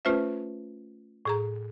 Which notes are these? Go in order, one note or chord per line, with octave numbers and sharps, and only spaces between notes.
A3 C#4 F4 B4 C5 E5
A2 G#4 A#5